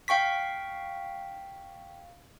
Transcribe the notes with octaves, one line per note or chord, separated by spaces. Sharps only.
F5 G5 C#6 B6